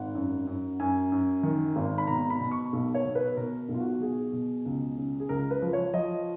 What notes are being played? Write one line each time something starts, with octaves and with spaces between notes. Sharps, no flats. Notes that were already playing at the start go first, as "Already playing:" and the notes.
Already playing: G#1 F#5
F#2
F#2
F#2 G#5
F#2
D#3
G#1
B5
B2 A#5
B5
B2
C#6
B1
C#5
B2
B4
B2 A#4
B1
F4
F#4
B2 G#4
B2
C#2
C#3
G#4
C#2 A#4
B4
F3
C#5
F3 D#5